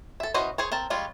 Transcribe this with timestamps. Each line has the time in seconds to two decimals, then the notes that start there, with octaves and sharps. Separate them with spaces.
0.20 A4 E5
0.34 E3 C#4 F#4 C5 D#5
0.58 G#4 C5 C#5
0.72 C4 A#4 A5
0.90 G3 G#3 C#4 F4